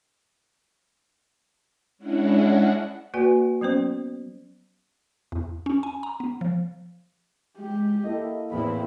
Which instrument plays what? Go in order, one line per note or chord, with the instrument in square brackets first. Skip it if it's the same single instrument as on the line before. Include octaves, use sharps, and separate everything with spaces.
[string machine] G#3 C#4 D4 E4 F#5
[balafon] A#3 F#4 B4 D5 G#5
F#3 B3 C#4 C5
[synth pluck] E2
C#4
G#5
A#5
B3
F3
[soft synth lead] G#3 [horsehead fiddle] G4
[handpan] A#3 E4 A4 [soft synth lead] D#5
[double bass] E2 A2 [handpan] A#3 [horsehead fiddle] C4 E4 [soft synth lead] B5